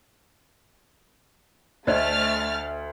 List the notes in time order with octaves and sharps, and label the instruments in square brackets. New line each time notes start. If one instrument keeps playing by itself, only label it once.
[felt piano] D2 [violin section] A3 F6 A6 [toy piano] C5 D5 D#5